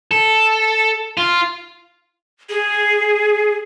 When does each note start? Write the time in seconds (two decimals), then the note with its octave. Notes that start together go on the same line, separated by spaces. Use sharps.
0.11 A4
1.17 F4
2.49 G#4